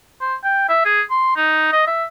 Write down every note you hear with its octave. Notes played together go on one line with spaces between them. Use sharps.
C5
G5
E5
G#4
C6
D#4
D#5
E5